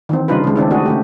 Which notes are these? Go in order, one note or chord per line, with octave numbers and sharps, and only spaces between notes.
D#3 E3 C4
C#3 G3 D4 D#4 F4 B4
C#3 G#3
D#3 C4 D4 E4
A3 D4 E4 F#4 G#4
C#3 A3 G4